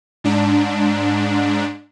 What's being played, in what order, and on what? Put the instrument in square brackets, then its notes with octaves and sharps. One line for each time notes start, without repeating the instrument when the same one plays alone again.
[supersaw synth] G#2 D4